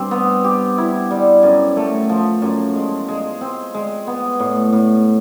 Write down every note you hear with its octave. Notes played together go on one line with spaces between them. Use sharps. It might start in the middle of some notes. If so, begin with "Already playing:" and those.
Already playing: G2 C4
B3
G4
E4
G3
F#2
A3
F3
F#2
G#3
G#3
C4
G#3
B3
A2
A2